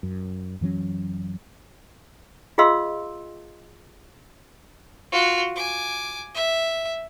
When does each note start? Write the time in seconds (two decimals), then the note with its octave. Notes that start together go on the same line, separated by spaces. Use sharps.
0.03 F#2
0.61 F#2 E3 F#3 C#4
2.58 F4 G#4 D#5 F5 C6 E6
5.12 F4 F#4
5.56 G#5 D6
6.35 E5